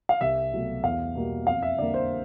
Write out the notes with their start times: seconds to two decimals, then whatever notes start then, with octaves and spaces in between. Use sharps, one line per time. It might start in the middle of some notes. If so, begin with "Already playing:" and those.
0.09 F5
0.21 C2 E5
0.52 B2 F#3 A3
0.84 E2 F5
1.15 B2 G3 A#3
1.47 F2 F5
1.62 E5
1.78 D3 G3 A#3 D5
1.94 C5